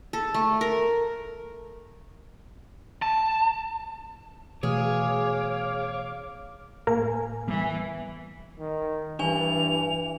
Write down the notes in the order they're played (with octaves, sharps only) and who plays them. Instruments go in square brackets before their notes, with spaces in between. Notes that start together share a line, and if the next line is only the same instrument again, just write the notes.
[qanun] A4
A3
A#4
[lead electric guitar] A5
[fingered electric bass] B2 E3 A3 [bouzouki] G#4 [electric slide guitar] C#5 [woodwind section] F5 D6
[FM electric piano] A2 G#5 [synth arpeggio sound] A#3
[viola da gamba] E3 [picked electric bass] G3 B3
[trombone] D#3
[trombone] G2 [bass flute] E3 [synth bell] D4 G#5 [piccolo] F7